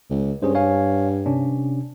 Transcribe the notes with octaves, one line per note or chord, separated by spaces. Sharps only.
C#2
G2 C#4 G#4 C5
C#5 F5 G#5
C3 C#4 D4